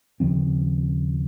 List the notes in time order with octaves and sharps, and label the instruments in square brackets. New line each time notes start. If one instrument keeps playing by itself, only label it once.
[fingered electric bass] D#2 C#3 F3 C4